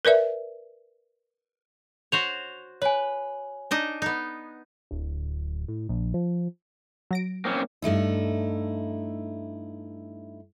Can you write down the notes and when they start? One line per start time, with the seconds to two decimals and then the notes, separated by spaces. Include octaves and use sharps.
0.05 A#4 B4 D5 E5
2.12 F#4 C5 C#5 F7
2.82 B4 C#5 G#5
3.71 D4 D#4 D#5
4.02 B3 D#4
4.91 D1
5.68 A2
5.89 A#1
6.14 F3
7.11 F#3 A#6 D7
7.45 A#3 C4 C#4
7.82 G2 A3 D#4 E4